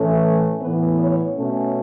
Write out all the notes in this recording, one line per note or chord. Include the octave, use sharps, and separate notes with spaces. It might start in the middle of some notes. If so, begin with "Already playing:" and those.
Already playing: A2 E3 A3 C#4
A2 E3 B3 B4
C#5
B2 A3 C#4